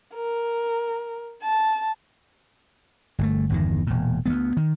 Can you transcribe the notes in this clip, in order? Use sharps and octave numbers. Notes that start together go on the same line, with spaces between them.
A#4
A5
G1 C3 A3
G1 E2 D#3
E1 A#2
D2 G3 B3
D#3